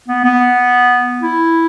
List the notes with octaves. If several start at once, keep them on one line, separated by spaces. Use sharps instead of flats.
B3
B3
E4